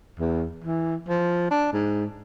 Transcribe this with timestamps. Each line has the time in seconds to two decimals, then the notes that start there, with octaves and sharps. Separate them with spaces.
0.20 E2
0.65 E3
1.09 F3
1.51 D4
1.73 G#2